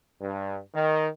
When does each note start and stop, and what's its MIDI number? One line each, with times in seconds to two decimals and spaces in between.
0.22 0.59 43
0.75 1.08 51